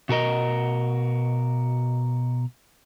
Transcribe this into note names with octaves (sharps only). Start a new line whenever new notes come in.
B2 F#4 A#4 D#5